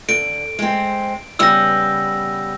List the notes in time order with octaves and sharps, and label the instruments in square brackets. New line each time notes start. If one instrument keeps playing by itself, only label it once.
[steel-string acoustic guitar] D3 [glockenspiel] D7
[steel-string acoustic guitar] G#3 C4
[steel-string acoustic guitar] C#3 G3 B3 [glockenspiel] E6 A#6